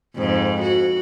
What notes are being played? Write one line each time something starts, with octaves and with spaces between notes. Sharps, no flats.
F2 G#2
F#4